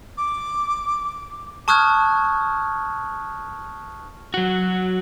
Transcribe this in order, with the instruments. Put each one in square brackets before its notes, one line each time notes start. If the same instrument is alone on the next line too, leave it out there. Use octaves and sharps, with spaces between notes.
[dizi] D6
[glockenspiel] A5 C#6 D#6 F6 F#6 G#6
[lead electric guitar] F#3 F#4